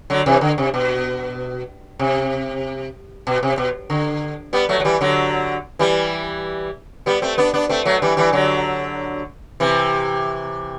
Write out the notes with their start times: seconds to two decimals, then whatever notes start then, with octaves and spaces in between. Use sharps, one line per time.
0.10 D3 F#3
0.26 C3 E3
0.41 D3
0.58 C3
0.74 B2
1.99 C3
3.27 B2
3.43 C3
3.58 B2
3.90 D3
4.53 G3 B3
4.69 F#3 A3
4.80 F#3
4.85 E3 G3
5.01 D3 F#3
5.79 E3 G3
7.06 G3 B3
7.22 A3 C4
7.38 B3 D4
7.54 B3 D4
7.69 A3 C4
7.85 F#3 A3
8.02 E3 G3
8.17 E3 G3
8.33 D3 F#3
9.60 C3 E3